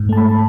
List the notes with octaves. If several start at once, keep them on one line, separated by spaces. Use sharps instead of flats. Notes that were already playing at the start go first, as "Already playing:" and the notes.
Already playing: G#2
A3 A5
B5
A5